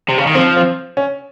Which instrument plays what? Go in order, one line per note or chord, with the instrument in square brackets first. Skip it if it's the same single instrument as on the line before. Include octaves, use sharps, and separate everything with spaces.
[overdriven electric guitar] C3
C#3
D#3
[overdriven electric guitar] F3 [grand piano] C4
[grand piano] C4
C#4